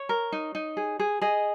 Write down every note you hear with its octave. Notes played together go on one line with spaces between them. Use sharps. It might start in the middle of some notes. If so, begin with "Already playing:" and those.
Already playing: C#5
A#4
D#4
D#4
G#4
G#4
G#4 D#5